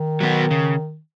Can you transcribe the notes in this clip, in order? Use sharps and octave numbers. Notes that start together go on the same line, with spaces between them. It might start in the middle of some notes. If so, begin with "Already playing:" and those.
Already playing: D#3
F#3 B3 F#4
C#3